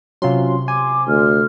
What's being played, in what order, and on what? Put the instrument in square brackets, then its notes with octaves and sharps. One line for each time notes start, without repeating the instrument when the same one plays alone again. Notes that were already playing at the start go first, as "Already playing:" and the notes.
[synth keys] C3 C6 [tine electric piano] F#3 C#4 F4
[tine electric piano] G#5 [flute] D6
[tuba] D2 [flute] F6